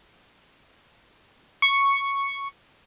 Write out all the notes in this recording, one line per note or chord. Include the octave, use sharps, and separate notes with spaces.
C#6